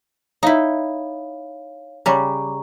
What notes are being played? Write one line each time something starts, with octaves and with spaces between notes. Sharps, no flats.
D#4 E4 C#5 F5
C#3 G3 A#5 C#6